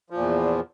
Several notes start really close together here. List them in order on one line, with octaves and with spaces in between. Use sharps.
F3 A#2 E2